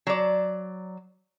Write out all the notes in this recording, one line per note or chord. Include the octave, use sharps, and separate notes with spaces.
F#3 D5